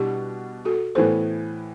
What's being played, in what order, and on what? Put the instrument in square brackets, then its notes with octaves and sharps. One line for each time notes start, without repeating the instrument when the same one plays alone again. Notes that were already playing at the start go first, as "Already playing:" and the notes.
Already playing: [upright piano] B2 G3 D4 [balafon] E4 G4
[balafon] F#4 A4
[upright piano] A2 E3 B3 [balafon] A4 C5